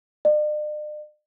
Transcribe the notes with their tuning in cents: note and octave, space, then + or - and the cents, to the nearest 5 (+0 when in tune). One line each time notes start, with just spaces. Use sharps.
D5 +45